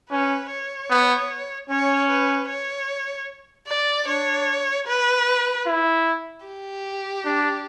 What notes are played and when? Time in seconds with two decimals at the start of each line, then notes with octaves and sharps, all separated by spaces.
0.10 C#4 B4
0.51 C#5
0.90 B3
1.70 C#4 C#5
2.09 B4
2.49 C#5
3.68 D5
4.07 D4 C#5
4.87 B4
5.67 E4
6.46 G4
7.25 D4